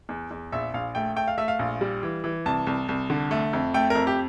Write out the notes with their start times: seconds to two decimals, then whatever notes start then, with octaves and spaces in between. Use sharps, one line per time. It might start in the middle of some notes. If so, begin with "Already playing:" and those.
0.09 E2
0.31 E2
0.52 A#1 E5
0.74 A#1 F5
0.95 A3 G5
1.16 A3 G5
1.28 F5
1.38 A3 E5
1.48 F5
1.59 A#1
1.81 G3
2.03 E3
2.24 E3
2.46 C2 A5
2.67 C2
2.89 C2
3.10 D3
3.31 A3
3.53 F2
3.74 A3 G5
3.90 F2 A#4
4.07 G4